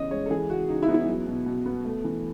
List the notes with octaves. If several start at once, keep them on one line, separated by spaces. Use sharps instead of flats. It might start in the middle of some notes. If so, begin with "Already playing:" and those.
Already playing: C#3 E3 B3 C#4 D#5
G#3 C#5
A4
E3 G#4
C#3 F#4
C#3 D#4
E4
B3 D#4
E4
F#3
B2
B2
B3
A3
E3